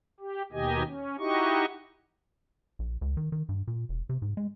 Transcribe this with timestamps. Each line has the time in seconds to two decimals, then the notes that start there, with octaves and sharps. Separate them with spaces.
0.20 G4
0.52 D#2 B2 D#3 G4 D#5 G#5
0.87 C#4
1.19 D#4 E4 F#4 G4 D#5 C#6
2.79 A#1
3.01 C#2
3.17 D#3
3.32 D#3
3.49 G2
3.67 A#2
3.89 E1
4.09 C3
4.22 G#2
4.37 G#3